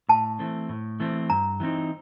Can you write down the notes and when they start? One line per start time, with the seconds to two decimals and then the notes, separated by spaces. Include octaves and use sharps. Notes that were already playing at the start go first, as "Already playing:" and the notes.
0.09 A2 A5
0.39 E3 A3 C4
0.69 A2
1.00 E3 A3 C4
1.30 G2 A#5
1.60 E3 G3 C4 D#4